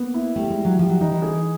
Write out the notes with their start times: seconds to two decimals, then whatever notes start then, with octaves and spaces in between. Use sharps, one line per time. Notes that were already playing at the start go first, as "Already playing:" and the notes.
Already playing: A#3 B3
0.14 E4
0.36 G3 A3
0.50 G#3
0.57 E4
0.65 F#3
0.79 F3 G3
0.90 F#3
1.01 E3 D#4
1.12 E3
1.22 G#4